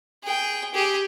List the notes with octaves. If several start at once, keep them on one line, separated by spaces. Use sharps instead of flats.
G#4 G5
G4 G#4